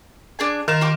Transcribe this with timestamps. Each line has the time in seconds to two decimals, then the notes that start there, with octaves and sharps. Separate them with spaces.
0.39 D4 G#4 G#5
0.68 D#3 F4 A#4 E7
0.81 F4 G4 D6